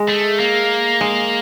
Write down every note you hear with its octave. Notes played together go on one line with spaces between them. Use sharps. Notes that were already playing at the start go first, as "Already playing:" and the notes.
Already playing: G#3
A3
A#3
G#3